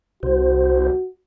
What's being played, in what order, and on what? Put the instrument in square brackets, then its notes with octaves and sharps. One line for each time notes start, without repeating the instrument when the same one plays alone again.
[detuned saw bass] C2 [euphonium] F#4 [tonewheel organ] C5